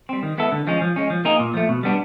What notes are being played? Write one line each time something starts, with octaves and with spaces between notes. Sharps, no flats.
G3 C4
D#3
G#3 B3 E4 A4
D3
F3 G#3 C#4
F3
G#3 C#4
F3
A#3 D#4 G#4
A#2
F3 A3
B2
G3 B3 D4